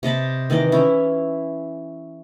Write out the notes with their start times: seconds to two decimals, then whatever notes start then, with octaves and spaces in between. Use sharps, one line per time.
0.03 C3 D#5 A5 B5
0.50 D#3 E3 D5 D#5
0.72 C#4 E4